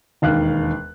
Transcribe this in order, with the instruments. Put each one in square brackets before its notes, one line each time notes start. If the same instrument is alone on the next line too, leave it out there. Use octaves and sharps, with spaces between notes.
[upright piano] E1 D#2 F5 F#6